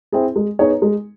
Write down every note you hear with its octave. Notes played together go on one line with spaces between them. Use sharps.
C4 E4 G#4
G#3
B3 D#4 G#4 C#5
G#3